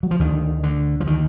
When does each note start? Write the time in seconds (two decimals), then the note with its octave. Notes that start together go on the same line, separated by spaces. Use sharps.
0.03 F#3
0.11 F3
0.19 D2 D3 D#3
0.63 D3
1.00 F3
1.07 D#3